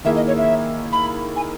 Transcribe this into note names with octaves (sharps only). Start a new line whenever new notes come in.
D#3 A#3 E4 G#4 E5
D#5
C#5
E5
B5
G#5